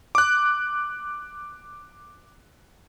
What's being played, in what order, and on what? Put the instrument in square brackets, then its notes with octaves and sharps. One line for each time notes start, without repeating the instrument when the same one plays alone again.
[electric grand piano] D6 F#6